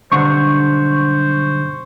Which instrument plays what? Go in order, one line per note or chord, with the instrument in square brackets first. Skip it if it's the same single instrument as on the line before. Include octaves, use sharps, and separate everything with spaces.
[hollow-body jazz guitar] B1 G2 D3 [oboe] C5 [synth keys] C#6